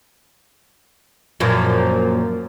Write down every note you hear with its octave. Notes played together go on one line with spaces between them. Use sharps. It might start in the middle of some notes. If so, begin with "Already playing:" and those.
F#2 A#2 F3